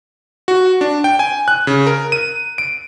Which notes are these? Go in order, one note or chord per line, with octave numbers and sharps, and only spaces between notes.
F#4
D4
G5
G#5
F#6
C#3
A#4
D#7
D7